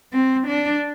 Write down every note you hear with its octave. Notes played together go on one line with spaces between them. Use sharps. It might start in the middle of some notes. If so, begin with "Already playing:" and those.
C4
D4